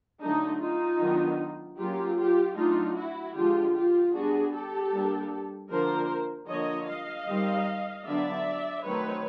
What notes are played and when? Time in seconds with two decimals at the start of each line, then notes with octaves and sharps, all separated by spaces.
0.21 D3 F#3 A3 D4 D#4
0.61 D#4 F4
1.00 D#3 F#3 B3 D4
1.79 F#3 A#3 C#4 F4 G4
2.18 F4 G4
2.56 F#3 A3 D4 D#4 F4
2.96 E4 F#4
3.35 D3 F3 G#3 F4 G4
3.74 F4 G4
4.13 G3 B3 D4 F#4 G#4
4.54 G4 A4
4.92 G3 A#3 D4
5.70 D3 F3 A#3 D4 A#4 C5
6.48 D3 F3 A#3 C#5 D#5
6.88 D#5 F5
7.27 D#3 G3 C4
8.06 D3 F#3 B3 D4 D5 E5
8.84 D#3 F#3 A3 C4 B4 C#5